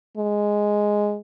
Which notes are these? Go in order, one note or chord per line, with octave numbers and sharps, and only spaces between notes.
G#3